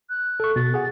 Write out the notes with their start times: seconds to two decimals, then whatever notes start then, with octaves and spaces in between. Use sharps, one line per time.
0.10 F#6
0.40 A4 C#6
0.56 B2 A6
0.74 G#4 F#5